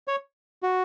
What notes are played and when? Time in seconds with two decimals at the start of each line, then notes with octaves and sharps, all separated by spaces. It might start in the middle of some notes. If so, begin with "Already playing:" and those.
0.08 C#5
0.63 F#4